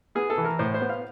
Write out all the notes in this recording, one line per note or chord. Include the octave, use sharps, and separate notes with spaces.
B3 G#4
A4
E3
A#4
A2 C5
C5
B3
F5